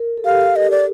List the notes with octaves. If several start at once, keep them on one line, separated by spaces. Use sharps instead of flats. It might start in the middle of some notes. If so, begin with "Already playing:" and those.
Already playing: A#4
A4
G4 F5
D#5
D5